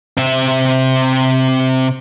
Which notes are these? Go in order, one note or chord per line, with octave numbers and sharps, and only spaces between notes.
C3 E5